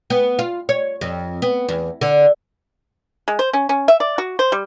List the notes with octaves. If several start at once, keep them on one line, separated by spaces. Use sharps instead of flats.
B3
F4
C#5
F2
B3
E2
D3
G#3
C5
C#4
C#4
E5
D5
F#4
C5
G3